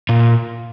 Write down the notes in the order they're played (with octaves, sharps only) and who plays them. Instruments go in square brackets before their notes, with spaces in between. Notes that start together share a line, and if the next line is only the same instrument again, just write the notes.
[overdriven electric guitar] A#2